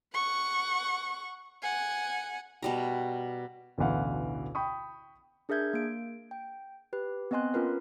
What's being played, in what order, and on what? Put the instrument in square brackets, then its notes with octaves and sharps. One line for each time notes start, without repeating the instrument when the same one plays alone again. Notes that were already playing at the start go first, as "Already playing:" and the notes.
[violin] F#5 C#6
F#5 G#5
[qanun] B2 G3 A#4
[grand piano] A1 D2 B2 E3 F5 F#5
G5 B5 C#6 D#6
[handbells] D4 G#4 A#4 E5 G6 G#6
A#3 D7
G5
G4 B4
B3 C4 D#5 G#5 C6 F#6
C#4 F4 A#4 B4